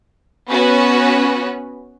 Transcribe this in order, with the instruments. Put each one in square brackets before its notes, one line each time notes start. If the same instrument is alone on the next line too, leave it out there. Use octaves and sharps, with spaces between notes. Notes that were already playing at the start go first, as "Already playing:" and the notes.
[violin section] B3 C#4 F#4 B4